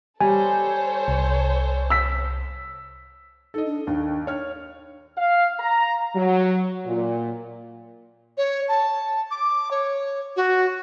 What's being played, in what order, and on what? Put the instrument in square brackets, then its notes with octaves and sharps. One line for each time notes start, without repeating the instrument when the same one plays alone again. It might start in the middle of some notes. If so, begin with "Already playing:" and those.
[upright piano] G3 [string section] A4 C5 C#5 [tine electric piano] G#5
[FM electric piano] C2
[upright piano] E6 B6
[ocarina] D#4 [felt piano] A4 D#5
[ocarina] D4
[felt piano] D#2 [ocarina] D4
[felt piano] C#5 F6
[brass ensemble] F5
A#5
F#3
A#2
[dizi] C#5
A5
D6
C#5
F#4